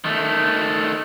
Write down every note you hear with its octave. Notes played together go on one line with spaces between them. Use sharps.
D#3 A3